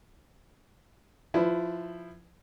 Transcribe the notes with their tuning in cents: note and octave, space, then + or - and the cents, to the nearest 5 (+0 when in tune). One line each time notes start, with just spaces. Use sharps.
F3 +5 E4 +10 B4 +30